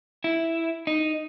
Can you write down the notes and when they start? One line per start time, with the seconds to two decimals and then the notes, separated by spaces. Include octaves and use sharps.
0.24 E4
0.87 D#4